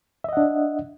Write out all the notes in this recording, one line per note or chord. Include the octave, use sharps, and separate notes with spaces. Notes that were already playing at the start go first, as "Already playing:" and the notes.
D4 D#5 E5 F#5